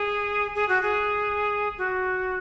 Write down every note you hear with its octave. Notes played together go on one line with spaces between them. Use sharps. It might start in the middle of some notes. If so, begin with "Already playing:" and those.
Already playing: G#4
G#4
F#4
G#4
F#4